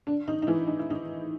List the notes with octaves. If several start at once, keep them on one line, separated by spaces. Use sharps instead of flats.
D3 D4
D#3 D#4
D#4
E3 E4
D#4
E4
D#3 D#4